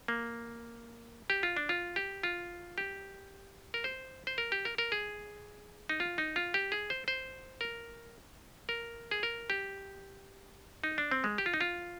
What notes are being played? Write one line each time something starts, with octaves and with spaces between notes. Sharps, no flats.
A#3
G4
F4
D4
F4
G4
F4
G4
A#4
C5
C5
A#4
G4
A#4
A#4
G#4
D#4
F4
D#4
F4
G4
G#4
C5
C5
A#4
A#4
G#4
A#4
G4
D#4
D4
C4
G#3
G4
F4
D#4
F4